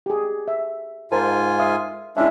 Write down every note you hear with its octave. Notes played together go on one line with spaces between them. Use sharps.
G4 G#4
E5
G#2 F4 A#4 C5 G#5 A5
E5 F5 D#6
G#3 C#4 D4 E4 E5